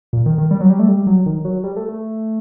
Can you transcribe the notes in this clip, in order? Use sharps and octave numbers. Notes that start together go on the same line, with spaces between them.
A#2
D#3
D#3
G3
F#3
G3
A3
G3
F#3
D#3
F#3
G3
A3
A3